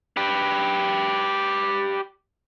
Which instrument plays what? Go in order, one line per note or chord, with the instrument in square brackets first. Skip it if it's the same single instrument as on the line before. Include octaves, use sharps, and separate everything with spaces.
[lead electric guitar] G4 B4